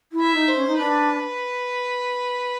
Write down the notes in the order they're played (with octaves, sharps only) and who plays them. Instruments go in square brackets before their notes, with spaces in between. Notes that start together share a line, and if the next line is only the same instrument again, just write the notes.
[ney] E4
[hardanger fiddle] E5
[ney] D#4
[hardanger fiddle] C5
[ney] C#4
D#4
[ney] D4 [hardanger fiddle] B4